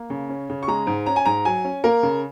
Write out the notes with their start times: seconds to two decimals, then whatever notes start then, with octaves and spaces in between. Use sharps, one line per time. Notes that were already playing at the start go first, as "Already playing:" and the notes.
Already playing: A#3
0.10 C#3
0.29 C#4
0.50 C#3
0.63 C#6
0.68 G#3 A#5
0.87 G#2
1.06 C#4 A#5
1.16 G#5
1.25 G#2 A#5
1.45 F#3 G#5
1.65 C#4
1.84 A#3 A#4
2.03 C#3